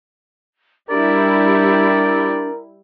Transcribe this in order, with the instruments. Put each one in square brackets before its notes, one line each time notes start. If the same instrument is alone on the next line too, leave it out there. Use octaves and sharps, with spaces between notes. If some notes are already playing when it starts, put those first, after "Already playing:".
[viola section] G3 E4 G4 [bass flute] D4 [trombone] A#4 [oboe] D5